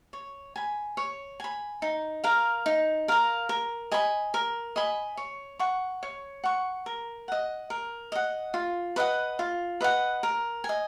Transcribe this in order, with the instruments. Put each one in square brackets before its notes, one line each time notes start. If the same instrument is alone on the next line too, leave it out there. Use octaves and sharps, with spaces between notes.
[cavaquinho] C#5
G#5 B5
C#5
G#5 B5
D#4
A#4 F5 A#5
D#4
A#4 F5 A#5
A#4
D#5 G#5 B5
A#4
D#5 G#5 B5
C#5
F#5 C#6
C#5
F#5 C#6
A#4
D#5 F#5
A#4
D#5 F#5
F4
B4 D#5 F#5
F4
B4 D#5 F#5
A#4
G#5
D#5